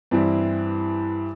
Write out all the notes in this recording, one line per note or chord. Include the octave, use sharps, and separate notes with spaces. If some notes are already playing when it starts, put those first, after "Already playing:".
G2 E3 G3 C4 E4